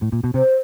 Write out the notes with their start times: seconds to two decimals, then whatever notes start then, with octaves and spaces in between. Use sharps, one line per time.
0.02 A2
0.13 A#2
0.24 B2
0.34 C3 C5